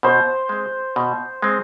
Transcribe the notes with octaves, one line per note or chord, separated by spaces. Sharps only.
B2 C5
G#3 C4
B2
G#3 C4